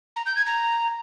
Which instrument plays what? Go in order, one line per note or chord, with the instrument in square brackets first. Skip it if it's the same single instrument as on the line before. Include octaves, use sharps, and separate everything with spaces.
[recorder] A#5
G6
G#6
A#5